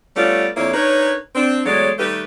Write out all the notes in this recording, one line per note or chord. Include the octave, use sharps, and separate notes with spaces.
G3 A3 B3 C#4 F4 D5
F2 A#3 D4 E4 C#5
D4 D#4 A#4 B4 C#5
C4 D4
E2 F#3 G#3 A3 C#5 D5
D#3 G3 A3 G4 B4